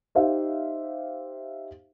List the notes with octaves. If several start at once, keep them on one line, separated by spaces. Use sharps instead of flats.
D#4 G4 C5 E5 F5